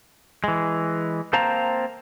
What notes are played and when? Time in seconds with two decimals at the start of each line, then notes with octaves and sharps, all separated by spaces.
0.44 E3 G#3
1.33 A#3 C4 C5 F5 A5 A#5